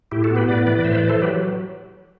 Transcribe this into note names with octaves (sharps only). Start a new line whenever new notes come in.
A2 E4 G4
F#4 A4
B3
G4 B4
A2 B4 D5
E3 B4 D5
A2 C5 E5
B4 D5
E3
A4 C5
F#3 G4 B4